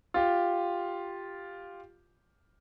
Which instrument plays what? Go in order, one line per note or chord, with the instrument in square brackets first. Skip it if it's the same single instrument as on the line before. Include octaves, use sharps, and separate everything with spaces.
[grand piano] F4 G4